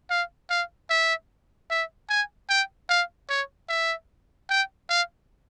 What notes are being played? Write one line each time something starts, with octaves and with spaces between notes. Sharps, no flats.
F5
F5
E5
E5
G#5
G5
F5
C#5
E5
G5
F5